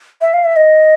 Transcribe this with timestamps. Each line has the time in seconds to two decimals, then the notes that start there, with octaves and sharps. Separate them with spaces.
0.21 E5
0.34 F5
0.45 E5
0.56 D#5